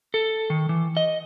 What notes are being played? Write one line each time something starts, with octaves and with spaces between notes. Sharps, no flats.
A4
D#3
E3
D#5